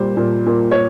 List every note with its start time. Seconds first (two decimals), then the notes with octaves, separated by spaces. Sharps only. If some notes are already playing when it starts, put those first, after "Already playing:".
Already playing: A#2 G3 C5
0.17 A#2
0.46 A#2
0.71 C#5